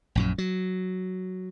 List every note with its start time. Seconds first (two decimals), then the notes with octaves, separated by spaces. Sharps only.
0.15 A#1 F#2 A#2
0.38 F#3